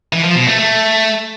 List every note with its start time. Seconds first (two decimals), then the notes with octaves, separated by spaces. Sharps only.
0.13 E3
0.24 F3
0.36 B2
0.47 A3
0.59 A3